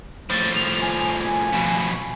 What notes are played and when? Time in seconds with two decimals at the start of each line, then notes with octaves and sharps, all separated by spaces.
0.30 A2 F3 A6
0.55 F7
0.81 G#5
1.53 F2 B2